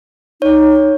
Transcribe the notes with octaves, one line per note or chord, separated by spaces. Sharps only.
D#4 C#5